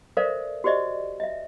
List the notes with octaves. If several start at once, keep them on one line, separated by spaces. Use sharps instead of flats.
A4 A#4 C5 D5 E5 F5
F#4 G4 C5 D5 D#5
D#5 E5